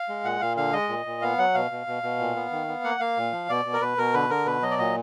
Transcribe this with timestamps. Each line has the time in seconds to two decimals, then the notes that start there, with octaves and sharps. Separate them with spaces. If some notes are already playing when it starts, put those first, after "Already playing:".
Already playing: F5
0.09 G#3
0.24 A#2 F#5
0.41 A#2 F5
0.57 D3 F5
0.73 G#3 D#5
0.89 A#2
1.06 A#2
1.22 B3 F5
1.38 F#3 F#5
1.54 B2 F5
1.71 B2
1.87 B2
2.03 B2
2.19 A#2
2.36 B3
2.52 D#3
2.68 B3
2.84 A#3 F#5
3.00 A#3 F5
3.17 A#2
3.32 F3
3.49 B2 D5
3.65 B2
3.73 A#4
3.81 B2 B4
3.98 B2 A#4
4.14 D3 B4
4.30 D3 A#4
4.46 B2 B4
4.62 F#3 D#5
4.71 D5
4.79 A#2 D#5